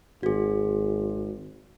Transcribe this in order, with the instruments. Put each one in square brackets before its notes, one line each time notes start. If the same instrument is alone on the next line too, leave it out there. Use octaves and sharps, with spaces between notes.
[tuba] G#1 [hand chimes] F#4 G#4